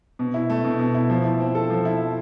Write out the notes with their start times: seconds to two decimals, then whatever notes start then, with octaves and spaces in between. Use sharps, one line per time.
0.19 B2
0.34 E4
0.50 A3
0.64 B2
0.79 B2
0.94 E4
1.10 F3
1.25 E4
1.40 C4
1.55 A4
1.70 F3
1.85 E4